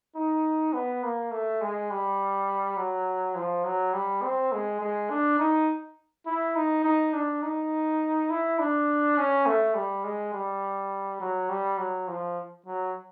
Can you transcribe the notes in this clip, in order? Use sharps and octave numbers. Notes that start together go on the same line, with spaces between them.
D#4
B3
A#3
A3
G#3
G3
F#3
F3
F#3
G3
C4
G#3
G#3
D4
D#4
E4
D#4
D#4
D4
D#4
E4
D4
C#4
A3
G3
G#3
G3
F#3
G3
F#3
F3
F#3